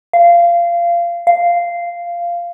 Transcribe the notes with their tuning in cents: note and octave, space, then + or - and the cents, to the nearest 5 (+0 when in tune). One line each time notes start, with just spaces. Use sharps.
F5 -20
F5 -10